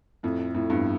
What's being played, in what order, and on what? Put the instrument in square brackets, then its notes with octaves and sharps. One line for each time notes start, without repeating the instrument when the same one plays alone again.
[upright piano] F2 A2
F2 A2
E2 G2